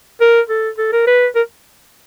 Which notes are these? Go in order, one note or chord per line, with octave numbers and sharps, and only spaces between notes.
A#4
A4
A4
A#4
B4
A#4